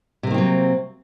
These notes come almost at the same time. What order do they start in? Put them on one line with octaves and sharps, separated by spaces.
C3 A#3 D#3 C4 F#3